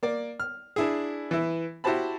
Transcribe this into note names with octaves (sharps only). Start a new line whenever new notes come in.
A#3 D5
F6
D4 E4 G#4
E3 E4
E4 F#4 G4 C5 A5 B5